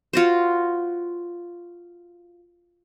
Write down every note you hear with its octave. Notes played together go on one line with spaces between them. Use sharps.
F4 F#4 C5